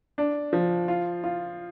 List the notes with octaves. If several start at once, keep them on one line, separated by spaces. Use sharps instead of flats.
D4
F3
F4
F4